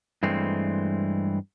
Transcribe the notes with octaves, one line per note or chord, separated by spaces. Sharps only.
G2 E3 G#3 A3 C4